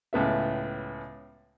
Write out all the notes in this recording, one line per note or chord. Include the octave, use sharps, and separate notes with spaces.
C#2 A2 B3 E5